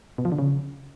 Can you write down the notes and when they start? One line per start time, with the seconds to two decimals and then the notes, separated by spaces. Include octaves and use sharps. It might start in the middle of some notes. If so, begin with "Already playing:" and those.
0.18 B2
0.25 F3
0.32 D3
0.39 C#3